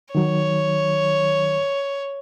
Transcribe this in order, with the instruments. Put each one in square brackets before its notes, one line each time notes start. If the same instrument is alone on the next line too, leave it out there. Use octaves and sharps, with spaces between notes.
[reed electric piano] D#3 F#3 [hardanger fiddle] C#5